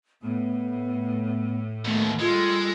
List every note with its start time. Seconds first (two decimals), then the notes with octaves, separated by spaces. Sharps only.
0.22 A2 B3
1.85 D#2 B2 A3
2.20 G3 G#3 F4 A4